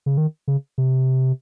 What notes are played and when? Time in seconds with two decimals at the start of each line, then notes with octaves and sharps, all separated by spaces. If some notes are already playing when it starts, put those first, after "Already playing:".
0.06 C#3
0.17 D#3
0.48 C#3
0.78 C3